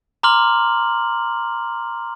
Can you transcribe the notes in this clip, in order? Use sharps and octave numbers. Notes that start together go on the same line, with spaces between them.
A#5 C6 D6 F6 F#7